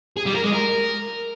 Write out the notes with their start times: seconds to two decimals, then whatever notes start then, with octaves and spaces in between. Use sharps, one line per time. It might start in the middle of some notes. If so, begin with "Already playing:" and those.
0.17 G#4
0.26 G3
0.35 A#4
0.44 G#3
0.53 A#4